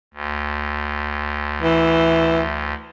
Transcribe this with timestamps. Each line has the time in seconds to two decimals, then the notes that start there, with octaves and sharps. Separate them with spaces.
0.14 D2
1.62 E3